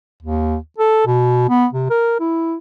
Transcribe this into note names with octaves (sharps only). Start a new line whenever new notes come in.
D#2
A4
B2
B3
C3
A#4
E4